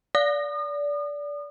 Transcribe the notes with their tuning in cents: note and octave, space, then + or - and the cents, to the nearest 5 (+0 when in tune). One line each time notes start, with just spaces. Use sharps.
D5 -20 D#6 -40